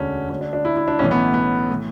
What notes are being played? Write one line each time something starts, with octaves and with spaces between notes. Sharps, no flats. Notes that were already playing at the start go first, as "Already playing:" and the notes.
Already playing: E1 D2 D3 C#4
D2 D3 C#4
D4
D4
E4
E4
D4
B1 A2 E3 C#4
B3
B3
A2 E3